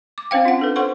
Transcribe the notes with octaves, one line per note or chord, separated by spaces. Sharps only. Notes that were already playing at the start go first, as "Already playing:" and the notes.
D6
C4 C#4 C5 F5 G5
F4 F#5
D4 A4 B4
A4 C5 F#5 C6 C#6